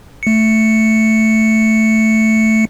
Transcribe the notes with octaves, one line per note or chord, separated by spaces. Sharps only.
A3 C#7